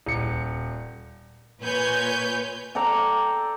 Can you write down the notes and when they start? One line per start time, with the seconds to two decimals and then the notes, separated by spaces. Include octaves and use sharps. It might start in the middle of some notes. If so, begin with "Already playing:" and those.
0.06 D#1 C#7
1.61 A#2 B4 C#5 G#5 G6
2.75 A4 D5 G5 A#5